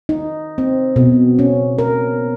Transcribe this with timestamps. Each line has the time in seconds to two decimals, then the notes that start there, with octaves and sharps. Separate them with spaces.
0.09 D#4
0.58 C4
0.96 B2
1.39 C#4
1.78 A#4